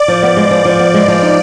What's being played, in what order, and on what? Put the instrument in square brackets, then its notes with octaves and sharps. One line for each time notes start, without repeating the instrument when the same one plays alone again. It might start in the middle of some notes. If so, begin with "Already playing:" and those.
Already playing: [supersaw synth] D5
[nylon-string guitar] F3
B3
G#3
F3
F3
B3
G#3
F3
D#4